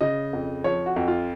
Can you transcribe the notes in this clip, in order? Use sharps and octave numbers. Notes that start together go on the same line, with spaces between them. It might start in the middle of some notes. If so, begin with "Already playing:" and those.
C#3 D#5
F2
F3 C#5
F#4
F2
F4